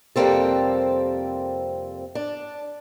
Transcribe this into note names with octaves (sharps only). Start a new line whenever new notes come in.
F2 C3 G3 A#3 C4 A4
D4